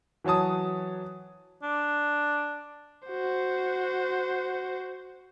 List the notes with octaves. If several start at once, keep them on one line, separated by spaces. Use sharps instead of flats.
E3 F#3 C#5 A5 D#6
D4
F#4 C5